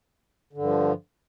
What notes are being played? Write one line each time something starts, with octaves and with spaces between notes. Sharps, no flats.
G2 D3 F3